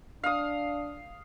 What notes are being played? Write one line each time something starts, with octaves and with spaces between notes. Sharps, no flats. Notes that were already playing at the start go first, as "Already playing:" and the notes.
D4 F5 D#6